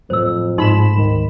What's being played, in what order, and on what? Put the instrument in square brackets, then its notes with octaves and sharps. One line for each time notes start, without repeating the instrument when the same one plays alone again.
[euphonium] F2 [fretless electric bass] A2 F#3 A3 [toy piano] C5 E6
[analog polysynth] G#2 B5 E7 [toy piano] D#4 C6
[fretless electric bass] D1 G3 [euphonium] D#3